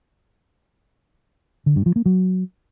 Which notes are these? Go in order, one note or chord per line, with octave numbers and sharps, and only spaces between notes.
D3
G2
F3
A#3
F#3